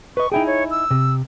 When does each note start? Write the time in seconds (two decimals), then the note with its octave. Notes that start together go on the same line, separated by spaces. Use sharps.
0.17 B4 D#5 C#6
0.32 D#4 E4 G#4 G5
0.47 C#5
0.71 E6
0.91 C3